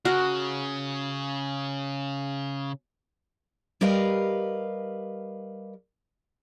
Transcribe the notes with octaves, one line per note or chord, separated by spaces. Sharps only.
C#3 F#4 A#4
G3 G4 A#4 B4 D#5 F5